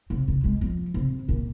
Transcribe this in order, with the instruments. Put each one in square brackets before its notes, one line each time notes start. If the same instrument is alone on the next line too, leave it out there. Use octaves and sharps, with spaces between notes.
[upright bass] C3
C3
G#3
F3
C3
A#2